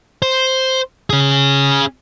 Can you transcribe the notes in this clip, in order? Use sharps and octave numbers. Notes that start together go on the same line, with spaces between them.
C5
C#4 G#4